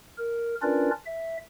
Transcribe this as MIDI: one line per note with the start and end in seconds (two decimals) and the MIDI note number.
0.18 0.55 70
0.62 0.90 61
0.62 0.90 62
0.62 0.90 65
0.62 0.90 70
0.62 0.90 71
0.62 0.90 74
1.06 1.37 76